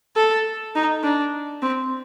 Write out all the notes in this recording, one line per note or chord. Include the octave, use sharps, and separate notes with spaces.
A4
D#4
D4
C4